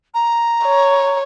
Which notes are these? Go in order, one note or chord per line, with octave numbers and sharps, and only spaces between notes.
A#5
C#5